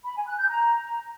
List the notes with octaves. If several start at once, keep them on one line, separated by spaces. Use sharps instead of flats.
B5
G#5
F#6
G6
A#5